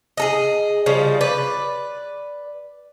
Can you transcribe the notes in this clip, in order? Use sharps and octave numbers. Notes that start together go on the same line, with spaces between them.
G#4 A4 D#5
C#3 F3 G3
B4 D5